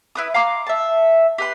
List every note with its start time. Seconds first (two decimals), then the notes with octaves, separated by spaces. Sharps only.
0.15 E4 B4 D#6
0.34 F5 A#5 C6 D6
0.67 E5 A5
1.38 G4 B4 C6